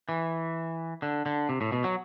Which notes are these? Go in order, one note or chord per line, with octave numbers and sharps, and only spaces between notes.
E3
D3
D3
C3
A2
B2
F#3